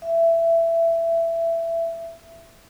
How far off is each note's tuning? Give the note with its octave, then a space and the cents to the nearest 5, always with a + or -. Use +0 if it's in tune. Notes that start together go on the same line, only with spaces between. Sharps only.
E5 +15